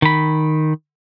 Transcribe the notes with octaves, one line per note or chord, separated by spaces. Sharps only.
D#3 B5